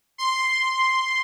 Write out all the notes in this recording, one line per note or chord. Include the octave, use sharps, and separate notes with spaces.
C6